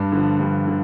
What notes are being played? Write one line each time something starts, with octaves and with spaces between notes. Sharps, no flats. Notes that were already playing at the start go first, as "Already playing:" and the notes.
Already playing: G2 D4
D3 F3
G2
D3